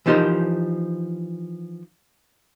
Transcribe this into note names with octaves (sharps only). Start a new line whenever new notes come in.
E3 F3 D#4 G4 A#4 C5